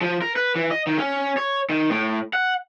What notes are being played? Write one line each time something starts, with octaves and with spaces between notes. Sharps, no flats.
F3
A#4
B4
E3
D#5
D#3
C#4
C#5
D#3
A2
F#5